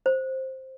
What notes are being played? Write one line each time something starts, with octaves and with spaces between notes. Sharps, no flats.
C5